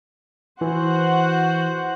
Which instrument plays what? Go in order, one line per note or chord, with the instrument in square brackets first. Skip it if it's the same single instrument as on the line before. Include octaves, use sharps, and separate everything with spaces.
[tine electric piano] E3 [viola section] F#4 C5 F#5